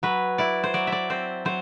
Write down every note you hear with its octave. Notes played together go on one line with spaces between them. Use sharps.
F#3 B4
E4 D5
C5
F#3 D5
E5
D5
C4 C5
F#3 C5